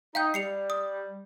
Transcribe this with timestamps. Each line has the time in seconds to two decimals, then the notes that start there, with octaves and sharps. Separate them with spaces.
0.15 D#4 F5 G5 G6
0.34 G3 C7 C#7 F7
0.70 D#6